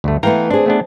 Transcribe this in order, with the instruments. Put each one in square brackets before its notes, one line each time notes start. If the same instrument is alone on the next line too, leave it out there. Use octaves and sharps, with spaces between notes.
[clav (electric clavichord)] D2 G2 A3
[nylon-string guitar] E3 A3 B3 [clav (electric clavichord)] F5 G5 A#5
[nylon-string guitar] C4 G#4 [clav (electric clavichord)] D4
[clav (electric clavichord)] A3 B3 D4